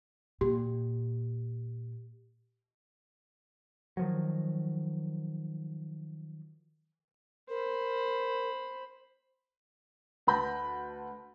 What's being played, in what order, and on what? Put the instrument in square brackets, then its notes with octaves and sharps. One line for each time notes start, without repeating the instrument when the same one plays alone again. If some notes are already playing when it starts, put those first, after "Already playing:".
[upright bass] A#2 [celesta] G4
[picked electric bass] D#3 F3 F#3
[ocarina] A#4 [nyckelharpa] C5 B5
[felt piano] D2 B4 A5 B5 G6 A#6